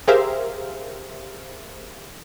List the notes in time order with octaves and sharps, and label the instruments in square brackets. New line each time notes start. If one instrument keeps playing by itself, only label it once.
[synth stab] G4 G#4 A#4 C5 E5 F5